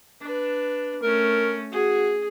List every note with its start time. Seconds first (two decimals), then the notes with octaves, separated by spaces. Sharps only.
0.22 D4 B4
1.03 A3 C#4 A#4
1.72 F#4 G#4